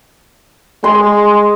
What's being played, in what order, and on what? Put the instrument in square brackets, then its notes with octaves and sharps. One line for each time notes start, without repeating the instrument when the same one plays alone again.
[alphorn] G#3 [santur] C6